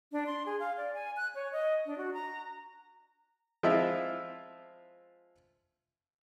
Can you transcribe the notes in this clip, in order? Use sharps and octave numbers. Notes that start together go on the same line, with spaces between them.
D4
C6
G#4
F5
D5
G#5
F#6
C#5
D#5
D4
F#4
A#5
F3 G#3 C4 E4 F4 E5